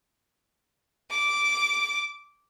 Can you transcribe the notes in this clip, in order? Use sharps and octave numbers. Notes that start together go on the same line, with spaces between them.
D6